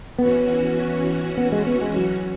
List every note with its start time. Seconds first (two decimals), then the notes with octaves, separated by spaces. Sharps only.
0.19 E3 B3 C#4 F#4
1.37 B3
1.52 G#3
1.67 B3
1.81 G#3
1.96 F#3